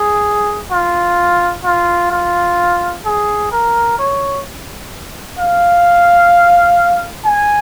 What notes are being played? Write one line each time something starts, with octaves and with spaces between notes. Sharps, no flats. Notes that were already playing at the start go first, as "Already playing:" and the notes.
Already playing: G#4
F4
F4
F4
G#4
A#4
C#5
F5
G#5